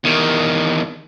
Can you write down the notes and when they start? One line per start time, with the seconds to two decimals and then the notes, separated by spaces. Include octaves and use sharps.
0.04 E2 D#3